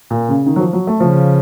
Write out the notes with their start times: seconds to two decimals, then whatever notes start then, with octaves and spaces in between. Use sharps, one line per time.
0.11 A#2
0.29 C#3
0.46 D#3
0.56 F#3
0.60 F3
0.73 F#3
0.87 A3
1.00 C#3 F3